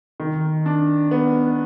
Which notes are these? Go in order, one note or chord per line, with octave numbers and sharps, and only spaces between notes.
D#3
D4
B3